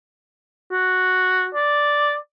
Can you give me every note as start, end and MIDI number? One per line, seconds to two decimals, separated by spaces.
0.71 1.48 66
1.55 2.15 74